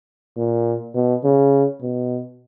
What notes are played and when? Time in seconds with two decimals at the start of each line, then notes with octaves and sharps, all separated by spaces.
0.37 A#2
0.95 B2
1.24 C#3
1.82 B2